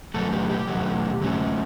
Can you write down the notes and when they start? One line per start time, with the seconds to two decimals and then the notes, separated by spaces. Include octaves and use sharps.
0.14 B2 F#3 A3 A4
0.32 G4
0.50 G4
0.68 B2 F#3 A3
1.21 D3 F#3 A3 C#4